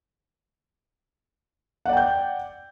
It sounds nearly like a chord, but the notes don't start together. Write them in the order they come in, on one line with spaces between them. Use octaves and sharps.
F#5 D5 G5 G6